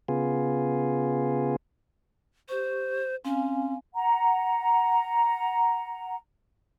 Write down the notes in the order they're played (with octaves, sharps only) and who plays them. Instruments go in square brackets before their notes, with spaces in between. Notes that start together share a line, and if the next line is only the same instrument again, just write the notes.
[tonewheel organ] C#3 B3 F4 G#4
[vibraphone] G4 C#6 [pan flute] C5
[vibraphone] C4 F5 G#5 [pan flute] C#4
[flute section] F#5 A#5